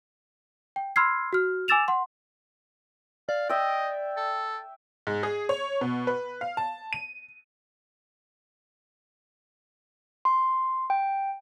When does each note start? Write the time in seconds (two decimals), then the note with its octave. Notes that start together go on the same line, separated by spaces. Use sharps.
0.76 G5
0.96 B5 C6 E6 F6 G#6 C7
1.33 F#4 F6
1.68 G#5 D6 E6 A6 E7 F7
1.88 F#5 C6
3.29 D5 F5
3.49 D#5 E5 G5
4.17 A4
5.07 G#2
5.23 G#4
5.49 C#5
5.81 B2
6.07 B4
6.41 F5
6.57 A5
6.93 D#7
10.25 C6
10.90 G5